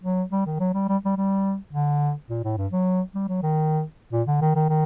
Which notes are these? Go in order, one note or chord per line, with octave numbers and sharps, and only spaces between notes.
F#3
G3
D#3
F#3
G3
G3
G3
G3
D3
A#2
A2
G2
F#3
G3
F#3
D#3
A#2
D3
D#3
D#3
D#3